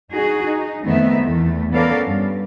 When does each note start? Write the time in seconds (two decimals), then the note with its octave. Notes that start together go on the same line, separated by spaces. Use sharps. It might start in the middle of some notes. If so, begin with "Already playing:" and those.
0.11 D#4 F#4 G#4
0.43 D#4
0.83 F2 D#3 A3 B3 C4 E5
1.22 E2 A3
1.73 B3 C#4 A4 A#4 D5 F5
2.06 G2